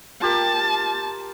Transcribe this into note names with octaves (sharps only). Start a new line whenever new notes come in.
F4 G4 A#4 A5